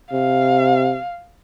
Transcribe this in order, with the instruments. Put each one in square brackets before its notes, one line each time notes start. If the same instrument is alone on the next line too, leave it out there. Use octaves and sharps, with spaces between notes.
[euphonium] C3 [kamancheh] F5